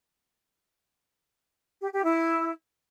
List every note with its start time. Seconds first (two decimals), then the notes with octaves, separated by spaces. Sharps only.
1.82 G4
1.92 G4
2.03 E4